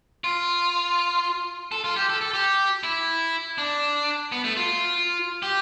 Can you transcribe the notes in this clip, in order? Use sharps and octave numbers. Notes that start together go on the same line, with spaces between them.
F4
A4
F4
G4
A4
A4
G4
E4
D4
B3
A3
F4
G4